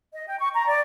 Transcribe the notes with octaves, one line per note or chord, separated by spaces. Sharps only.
D#5
G5
C#6
A#5
D5